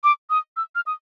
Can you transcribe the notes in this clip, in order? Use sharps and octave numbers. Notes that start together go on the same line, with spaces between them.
D6
D#6
E6
F6
D#6